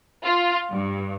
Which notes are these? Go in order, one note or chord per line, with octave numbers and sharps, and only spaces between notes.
F4
G2